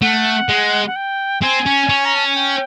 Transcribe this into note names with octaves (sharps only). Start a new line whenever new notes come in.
A3 F#5
G#3
F#5
G5
C4 G#5
C#4
C#4
A#5
A5
G#5
G5